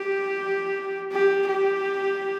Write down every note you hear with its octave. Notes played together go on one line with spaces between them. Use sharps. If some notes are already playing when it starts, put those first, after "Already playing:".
Already playing: G4
G4
G4